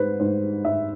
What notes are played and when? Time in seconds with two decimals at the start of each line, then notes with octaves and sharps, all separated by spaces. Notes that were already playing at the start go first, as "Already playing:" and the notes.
Already playing: G#2 B4 C5
0.20 G#2 C5
0.65 G#2 E5